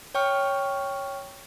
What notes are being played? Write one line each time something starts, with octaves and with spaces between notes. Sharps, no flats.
C#5 G5 C#6 F6